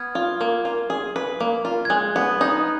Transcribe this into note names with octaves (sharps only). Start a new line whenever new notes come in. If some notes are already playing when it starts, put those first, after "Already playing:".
Already playing: B3 F6 G#6
F4
A#3
F4
G#4
B4
A#3
F4
G#6
G#3 F#6
B3
D#4